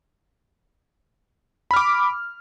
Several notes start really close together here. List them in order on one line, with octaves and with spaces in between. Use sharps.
B5 F6 D6